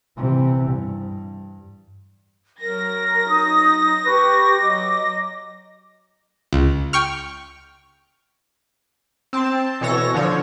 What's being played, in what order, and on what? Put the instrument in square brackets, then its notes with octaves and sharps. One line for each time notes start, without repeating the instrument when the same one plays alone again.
[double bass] C3 E3
G2
[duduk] F#3 [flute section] A#4 [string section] A#6
[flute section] D#4 D#6
[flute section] G4 C#6 [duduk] B4
[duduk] F#3 [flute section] D#5 D6
[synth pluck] C#2
G5 C#6 F6
[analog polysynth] C4 A5
B2 E3 A4 C#5 A#6
D3 F3 C#5